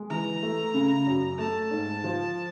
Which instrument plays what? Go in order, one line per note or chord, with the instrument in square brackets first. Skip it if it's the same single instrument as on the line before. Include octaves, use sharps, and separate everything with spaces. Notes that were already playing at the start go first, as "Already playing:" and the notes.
Already playing: [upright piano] G#3
[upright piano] E3 [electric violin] A#5
[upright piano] A3
C#3
F#2
[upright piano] A3 [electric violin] A5
[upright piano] G#2
F3